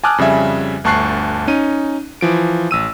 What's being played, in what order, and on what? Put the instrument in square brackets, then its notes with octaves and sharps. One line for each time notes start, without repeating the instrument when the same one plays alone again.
[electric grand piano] G#5 A5 D6 D#6 F6 F#6
F2 C#3 G3 E5 G#5
G1 D2 A5 C#6 F#6 C7
C#4 D#4 D#7
E3 F3 D7
A1 E6 D#7